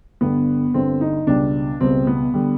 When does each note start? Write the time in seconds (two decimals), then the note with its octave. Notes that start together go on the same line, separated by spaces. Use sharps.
0.21 G1 G2 D3 G3 B3
0.74 G1 G2 D3 G3 C4
1.01 D#4
1.27 C#2 B2 G3 D4
1.80 C#2 B2 G3 C4
2.07 B3
2.34 D3 G3